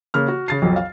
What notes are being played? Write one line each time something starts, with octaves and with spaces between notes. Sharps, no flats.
C#3 A#3 F6
F#4
C#3 A6 C7
B1 F2 F#3
F5